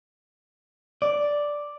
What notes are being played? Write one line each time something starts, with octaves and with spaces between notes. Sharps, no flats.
D5